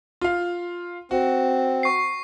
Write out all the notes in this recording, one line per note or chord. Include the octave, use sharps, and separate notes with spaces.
F4 F5
C4 F#4
C#6 C7